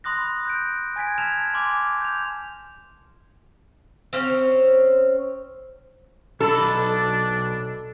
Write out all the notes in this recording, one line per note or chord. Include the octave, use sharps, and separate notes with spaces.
B5 C6 D#6 F#6 A#6
F#6 G6 D7
G#5 G#6 B6 D7
A5 F6 G#6 E7 F7
G#5 C6 D6 F6
G6 F7
C4 C#4 C5 C#5
B1 D4 A4 B5